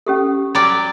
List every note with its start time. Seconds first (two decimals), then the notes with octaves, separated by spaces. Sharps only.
0.07 C#4 G4 A4
0.55 F#3 G3 D5